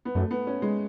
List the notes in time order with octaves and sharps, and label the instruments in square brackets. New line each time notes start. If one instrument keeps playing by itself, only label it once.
[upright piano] B3
[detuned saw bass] F#2 [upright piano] A3
[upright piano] B3
C#4
G#3